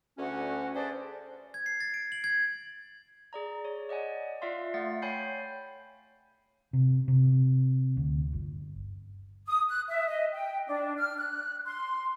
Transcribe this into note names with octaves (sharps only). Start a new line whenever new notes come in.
D2 C#4 F#4
D4 G#4 B4 C5 D5
G#6
C7
A6
D7
F#7
G#6
G#4 D5 A#5
C#5
D5 D#5 F#5 G#5
F4 D5 E5 F5 C6
A3 F5 F#5 A6
C#5 G5 G#5 B5 G6 C7
C3
C3
D2
G1
D#6
F#6
E5
D#5
G5
D4
F6
F#6
C6